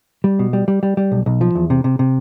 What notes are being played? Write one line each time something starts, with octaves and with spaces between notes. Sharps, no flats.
G3
B2
G3
G3
G3
G3
B1
B1
F3
E2
C3
C3
C3